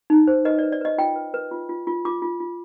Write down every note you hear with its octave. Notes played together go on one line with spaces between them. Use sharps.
D#4
C5
B4 D#5
B4 D5
D5
B4 D#5
F4 G5
B4
B4
F4
F4
F4
F4 D6
F4
F4